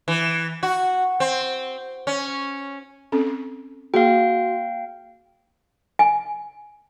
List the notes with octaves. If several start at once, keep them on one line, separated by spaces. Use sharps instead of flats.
E3
F#4
C4
C#4
C4 C#4 A4
A#3 F#4 G#4 F5 G5
G#5